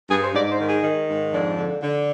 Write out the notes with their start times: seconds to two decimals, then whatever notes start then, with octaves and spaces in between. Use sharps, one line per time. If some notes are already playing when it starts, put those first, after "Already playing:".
0.10 G2 G#4
0.23 C5
0.34 G#2 D5
0.50 C5
0.59 D#3
0.67 G#4
0.84 D#3
1.08 G#2
1.32 F2 D4
1.57 D3
1.81 D3